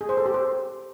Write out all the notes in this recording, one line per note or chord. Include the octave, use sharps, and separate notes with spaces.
G#4
C5
A4
G4
C5